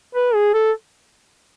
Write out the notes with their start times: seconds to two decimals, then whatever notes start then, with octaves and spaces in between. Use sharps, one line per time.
0.15 B4
0.35 G#4
0.54 A4